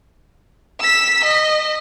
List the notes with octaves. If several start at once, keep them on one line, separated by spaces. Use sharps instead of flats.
E6 B6
D#5